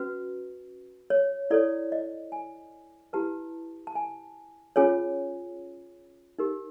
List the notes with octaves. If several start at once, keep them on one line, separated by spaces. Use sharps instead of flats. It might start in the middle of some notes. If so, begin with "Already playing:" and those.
Already playing: C#4 F#4 B4
C#5
E4 A4 C#5 D5
D#5
G#5
E4 G4 B4 A5
A5
G#5
C#4 F4 G#4 C#5 G#5
D#4 G4 A#4